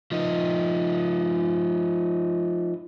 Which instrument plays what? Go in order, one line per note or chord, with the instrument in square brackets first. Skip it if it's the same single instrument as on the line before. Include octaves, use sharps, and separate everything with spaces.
[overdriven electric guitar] F3 D#4